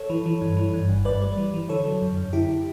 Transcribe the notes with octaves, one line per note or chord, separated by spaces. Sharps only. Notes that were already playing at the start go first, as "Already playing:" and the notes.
Already playing: A4 C#5
E3
E3
G2
E3
G2
G1
G2 B4 D5
G3
E3
E3
D3 A4 C#5
F#3
F#2
F#2
D3 E4 G4